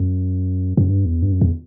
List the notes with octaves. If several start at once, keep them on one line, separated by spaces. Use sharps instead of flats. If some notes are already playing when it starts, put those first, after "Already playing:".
Already playing: F#2
F#2
G2
E2
G2
F#2
E2